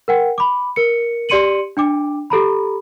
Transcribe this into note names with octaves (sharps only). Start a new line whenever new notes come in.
A#4 F#5 G5
B5 D6
A#4 C#7
G4 D5 C6 C#7 D#7 F#7
D4 G5 D6
G4 A4 A#5 B5